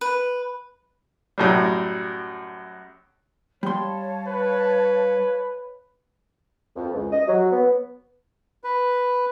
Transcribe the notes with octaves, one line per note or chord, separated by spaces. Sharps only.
B4
F#2 A2 G3
G3 C#5 F5 A5 C6
B4
F2
C#2
D#5
F#3
B3
B4